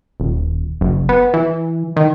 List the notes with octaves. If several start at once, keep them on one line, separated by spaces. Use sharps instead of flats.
D#1
F#1
B3
E3
D#3